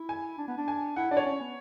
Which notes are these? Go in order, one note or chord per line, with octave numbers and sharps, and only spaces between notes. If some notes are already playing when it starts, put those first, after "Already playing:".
Already playing: E4
G#5
D4
B3
D4
G#5
E4 F#5
D4 D5
C#5
C#4
B3